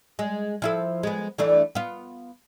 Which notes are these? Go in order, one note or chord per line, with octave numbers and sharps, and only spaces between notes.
G#3
F3 E4 A4
G#3 B3
E3 A3 D4
B3 F4